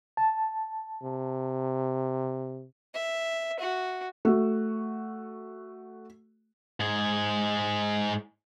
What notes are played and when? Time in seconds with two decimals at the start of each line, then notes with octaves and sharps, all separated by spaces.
0.17 A5
1.03 C3
2.94 E5
3.60 F#4
4.25 A3 F#4
6.80 G#2 G#4